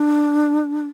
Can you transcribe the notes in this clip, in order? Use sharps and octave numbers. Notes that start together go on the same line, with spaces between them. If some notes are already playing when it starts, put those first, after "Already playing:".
Already playing: D4